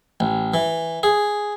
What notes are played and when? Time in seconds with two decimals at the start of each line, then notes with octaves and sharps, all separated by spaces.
0.20 A1
0.54 E3
1.03 G#4